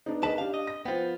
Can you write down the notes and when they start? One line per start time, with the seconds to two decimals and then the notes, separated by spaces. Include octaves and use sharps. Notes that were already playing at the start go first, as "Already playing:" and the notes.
0.06 B3 D4 D#4
0.23 D2 G#4 A#4 B4 D#5 A5
0.38 D4 G4 F5
0.54 D#5
0.67 A#6
0.85 F3 B3 F4 C5 G5